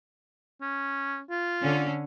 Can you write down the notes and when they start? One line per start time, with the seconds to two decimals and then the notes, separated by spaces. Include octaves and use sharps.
0.61 C#4
1.30 F4
1.63 D3 C#4